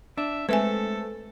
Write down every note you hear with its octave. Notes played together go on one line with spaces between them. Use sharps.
D4 E5
G#3 A3 C4 A4 B4 E5 G#5